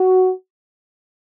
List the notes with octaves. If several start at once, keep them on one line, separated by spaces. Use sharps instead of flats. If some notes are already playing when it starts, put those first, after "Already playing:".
Already playing: F#4